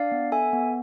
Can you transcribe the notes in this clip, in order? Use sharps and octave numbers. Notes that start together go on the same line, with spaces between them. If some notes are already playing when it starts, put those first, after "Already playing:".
Already playing: D4 D5 F5
B3
A4 E5 G#5
B3